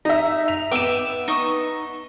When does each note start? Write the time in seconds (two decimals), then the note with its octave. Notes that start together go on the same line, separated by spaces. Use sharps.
0.05 D#4 E5 A#5
0.48 F7
0.71 B3 E5 G5 D6 E7
1.28 D#4 C#6 D#6